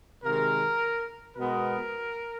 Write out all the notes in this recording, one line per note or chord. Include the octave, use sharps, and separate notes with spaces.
C3 D#3 G#3 A#4
B2 G#3 B3 A#4